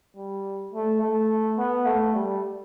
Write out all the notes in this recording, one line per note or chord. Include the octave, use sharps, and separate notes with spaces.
G3
A3
A3
B3
A3
G3